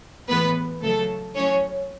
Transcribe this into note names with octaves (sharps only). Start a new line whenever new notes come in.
A2 E3 G#3 B3 B4
C#3 F#3 A3 A4
A2 F#3 C#4 C#5